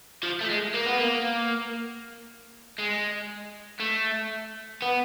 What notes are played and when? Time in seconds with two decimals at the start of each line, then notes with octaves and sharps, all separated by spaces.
0.23 F3
0.41 A3
0.50 G#3
0.74 A#3
0.86 B3
0.98 A#3
2.78 G#3
3.80 A3
4.82 B3